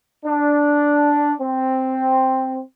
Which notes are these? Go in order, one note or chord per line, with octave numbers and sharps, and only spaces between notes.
D4
C4